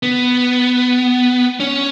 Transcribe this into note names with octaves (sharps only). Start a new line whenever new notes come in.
B3
C#4